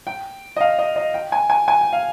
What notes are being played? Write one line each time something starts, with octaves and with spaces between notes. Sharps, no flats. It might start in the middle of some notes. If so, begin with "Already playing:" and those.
G5
D#5
F5
D#5
D#5
G5
G#5
G#5
G#5
G5
F5